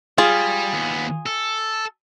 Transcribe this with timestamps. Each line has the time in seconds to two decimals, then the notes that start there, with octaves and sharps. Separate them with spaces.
0.18 G3 F4 G#4
0.73 D#2 B3
1.26 A4